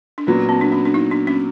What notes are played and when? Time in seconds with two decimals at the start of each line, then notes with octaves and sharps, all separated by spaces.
0.18 D4
0.27 A#2 F#3 B3 C#4
0.49 C4
0.61 D4
0.72 C#4
0.85 D4
0.94 D#4
1.11 D4
1.27 C#4